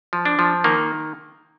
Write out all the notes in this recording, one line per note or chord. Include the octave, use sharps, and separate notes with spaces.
F3
D4
F3
D#3 A#3